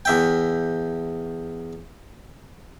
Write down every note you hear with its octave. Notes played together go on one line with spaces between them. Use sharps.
E2 E5 G5